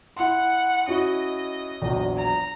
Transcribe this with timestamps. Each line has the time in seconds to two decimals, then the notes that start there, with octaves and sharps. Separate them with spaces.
0.16 E4 F#5 C6
0.88 C#4 E4 F#4 D#5
1.82 A#1 E2 F#3
2.15 A#5